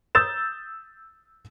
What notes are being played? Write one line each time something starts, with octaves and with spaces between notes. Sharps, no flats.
D#6 E6 G6 A6 E7